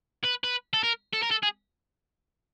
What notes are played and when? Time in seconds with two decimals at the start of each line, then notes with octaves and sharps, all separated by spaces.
0.24 B4
0.44 B4
0.73 A4
0.83 A#4
1.13 A4
1.23 A#4
1.31 A4
1.43 G#4